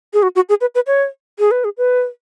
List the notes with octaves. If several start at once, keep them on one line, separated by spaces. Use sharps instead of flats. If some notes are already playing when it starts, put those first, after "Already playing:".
G#4
F#4
F#4
G#4
B4
B4
C#5
G#4
B4
G#4
B4